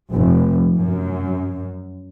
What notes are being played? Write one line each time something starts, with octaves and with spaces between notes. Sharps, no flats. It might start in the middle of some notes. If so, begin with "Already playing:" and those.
F1
F#2